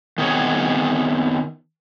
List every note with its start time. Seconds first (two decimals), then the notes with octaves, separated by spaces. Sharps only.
0.18 D#3 B3 C4 G#4 C#5